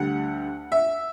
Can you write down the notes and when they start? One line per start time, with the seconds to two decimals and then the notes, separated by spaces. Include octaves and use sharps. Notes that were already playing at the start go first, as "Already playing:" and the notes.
Already playing: D2 D3 G3 F#5
0.72 E5